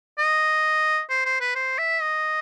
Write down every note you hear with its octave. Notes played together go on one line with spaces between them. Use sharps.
D#5
C5
C5
B4
C5
E5
D#5